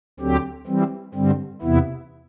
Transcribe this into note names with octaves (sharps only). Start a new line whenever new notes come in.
D2 D3 F#3 C4 G4
E3 G3 C4
G2 D3 G3 C4
E2 C3 E3 B3 E4